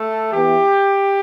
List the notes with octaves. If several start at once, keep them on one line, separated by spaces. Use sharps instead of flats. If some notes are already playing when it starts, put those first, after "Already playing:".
Already playing: A3 A4
E3 B3 E4 G4